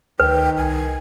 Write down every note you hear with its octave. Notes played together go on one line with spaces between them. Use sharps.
D2 D#3 B4 G5
C2 G#5